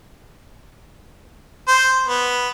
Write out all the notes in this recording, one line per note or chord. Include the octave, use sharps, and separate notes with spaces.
C5
B3